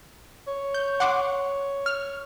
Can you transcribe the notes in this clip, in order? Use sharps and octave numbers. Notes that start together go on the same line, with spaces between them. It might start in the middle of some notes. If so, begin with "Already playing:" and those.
C#5
G6
F#5 C6 D6
F6